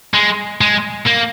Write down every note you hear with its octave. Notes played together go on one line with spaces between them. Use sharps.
G#3
G#3
A#3